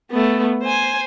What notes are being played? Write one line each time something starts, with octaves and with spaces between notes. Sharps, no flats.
A3 B3
C5 G#5